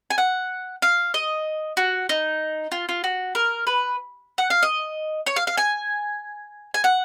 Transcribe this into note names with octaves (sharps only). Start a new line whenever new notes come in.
G#5
F#5
F5
D#5
F#4
D#4
F4
F4
F#4
A#4
B4
F#5
F5
D#5
C#5
F5
F5
G#5
G#5
F#5